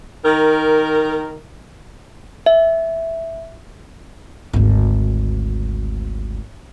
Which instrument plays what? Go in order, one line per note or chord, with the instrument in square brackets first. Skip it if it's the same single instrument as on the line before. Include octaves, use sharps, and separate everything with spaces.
[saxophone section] D#3 A#4
[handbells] E5
[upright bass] G#1 D2